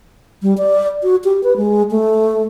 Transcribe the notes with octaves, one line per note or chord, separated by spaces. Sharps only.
G3
D5
F#4
G4
B4
G#3
A3